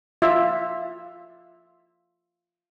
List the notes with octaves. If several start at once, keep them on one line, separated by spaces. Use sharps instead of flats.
F4 E5